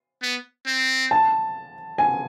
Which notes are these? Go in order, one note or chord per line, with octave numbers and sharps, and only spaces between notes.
B3
C4
A5
G#5